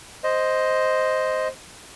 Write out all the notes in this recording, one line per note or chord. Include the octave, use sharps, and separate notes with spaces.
C5 D#5